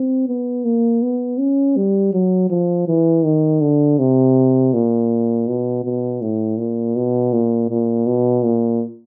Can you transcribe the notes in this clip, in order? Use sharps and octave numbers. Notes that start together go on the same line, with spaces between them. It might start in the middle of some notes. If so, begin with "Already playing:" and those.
Already playing: C4
B3
A#3
B3
C#4
G3
F#3
F3
E3
D#3
D3
C3
A#2
B2
B2
A2
A#2
B2
A#2
A#2
B2
A#2